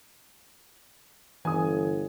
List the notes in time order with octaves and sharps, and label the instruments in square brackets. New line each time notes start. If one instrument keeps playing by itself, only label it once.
[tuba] G1 [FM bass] E3 [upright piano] G#5 D#6